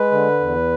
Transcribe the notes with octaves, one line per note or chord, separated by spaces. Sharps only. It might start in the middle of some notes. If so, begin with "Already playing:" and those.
Already playing: G#3 B4
D3
E2